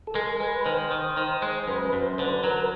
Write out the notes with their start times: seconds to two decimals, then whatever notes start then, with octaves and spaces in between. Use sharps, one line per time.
0.07 A4
0.15 G#3 A#4
0.40 G#3 B4
0.65 D#3 C5
0.91 D#3
1.17 D#3
1.42 G#3
1.68 F#2 B4
1.93 F#2 C5
2.18 D3 B4
2.44 F#3 A#4
2.61 B4